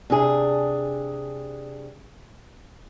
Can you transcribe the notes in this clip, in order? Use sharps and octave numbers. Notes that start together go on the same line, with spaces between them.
C3 D4 G#4